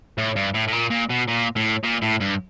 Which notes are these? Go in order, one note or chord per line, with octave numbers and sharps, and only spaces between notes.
A2
G2
A2
A2
A#2
A#2
B2
A#2
A2
A#2
A2
G2